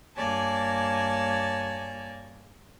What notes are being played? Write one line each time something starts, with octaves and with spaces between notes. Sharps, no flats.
G2 A#3 C#5 D5 G#5 A5